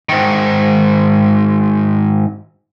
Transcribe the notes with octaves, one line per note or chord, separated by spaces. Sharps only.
G#2 D#3